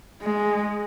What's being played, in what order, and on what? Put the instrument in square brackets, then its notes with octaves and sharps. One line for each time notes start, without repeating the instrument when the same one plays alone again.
[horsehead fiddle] G#3